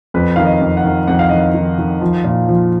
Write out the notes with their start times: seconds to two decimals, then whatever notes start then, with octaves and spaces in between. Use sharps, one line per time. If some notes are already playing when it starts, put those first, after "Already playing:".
0.14 F2 B4
0.36 D#3 F5
0.45 D#5
0.61 F2
0.77 F#5
0.84 D#3
1.07 F2 F#5
1.19 F5
1.29 D#3 D#5
1.40 F5
1.54 D#3
1.78 D#3
2.01 F3
2.24 A#2
2.48 F3